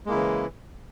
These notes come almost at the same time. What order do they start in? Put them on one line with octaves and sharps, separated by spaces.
G#3 A#3 E4 C#3 E3